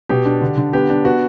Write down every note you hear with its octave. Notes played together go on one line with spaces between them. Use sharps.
B2 G4
D4
D3
D3
B3 G4
D4
B3 F#4